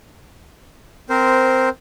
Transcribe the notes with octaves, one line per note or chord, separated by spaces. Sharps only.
C4 A#4 C5